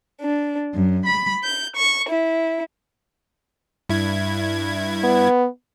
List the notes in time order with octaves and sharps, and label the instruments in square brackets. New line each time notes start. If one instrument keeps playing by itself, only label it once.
[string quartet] D4
F#2
B5
G6
C#6
E4
[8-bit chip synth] G2 E4 G#6
[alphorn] B3